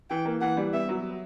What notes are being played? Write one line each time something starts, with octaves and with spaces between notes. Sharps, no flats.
E3 G5
A#3
E3 F#5
G3
B3 E5
F#3